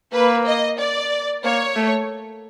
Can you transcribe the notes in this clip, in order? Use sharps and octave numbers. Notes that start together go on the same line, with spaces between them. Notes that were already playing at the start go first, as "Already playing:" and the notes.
A#3 B4
D#5
D5
A#3 C#5
A3